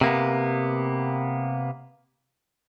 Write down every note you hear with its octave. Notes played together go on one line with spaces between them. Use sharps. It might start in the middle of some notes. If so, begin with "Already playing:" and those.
C3 A#3 B3